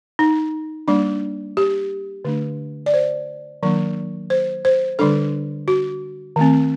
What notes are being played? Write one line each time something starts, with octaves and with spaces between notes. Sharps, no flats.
D#4
G3 A#3 D4
G4
D3 A3 D4
D5
C5
D#3 F#3 A#3 D4
C5
C5
D3 G3 D4 A4
F#4
D#3 A3 C4